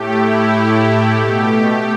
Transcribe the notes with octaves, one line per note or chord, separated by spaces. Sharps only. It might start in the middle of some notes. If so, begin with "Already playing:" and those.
Already playing: A2 A3 G4
E4
B2 A3 G4